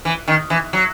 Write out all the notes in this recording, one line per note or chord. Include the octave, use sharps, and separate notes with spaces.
E3
D#3
E3
F#3